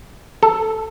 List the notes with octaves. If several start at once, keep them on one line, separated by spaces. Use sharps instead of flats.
A4